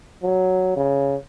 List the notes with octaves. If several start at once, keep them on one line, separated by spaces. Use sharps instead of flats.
F#3
C#3